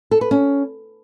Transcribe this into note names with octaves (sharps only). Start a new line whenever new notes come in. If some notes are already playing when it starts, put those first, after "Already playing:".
A4
B4
C#4